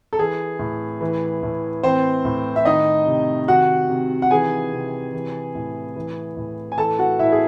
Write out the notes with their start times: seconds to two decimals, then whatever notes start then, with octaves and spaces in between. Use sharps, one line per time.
0.13 A4
0.18 E3 G#4
0.59 A2
1.01 E3
1.43 A2
1.83 E3 C4 C5
2.25 A2
2.56 E5
2.65 D#3 D#4 D#5
3.07 C3
3.48 D#3 F#4 F#5
3.90 C3
4.22 F#5
4.31 E3 G#4 G#5
4.73 C3
5.13 E3
5.55 A2
5.96 E3
6.37 A2
6.72 G#5
6.78 E3 A4 A5
6.99 F#4 F#5
7.19 A2 E4 E5
7.32 G#4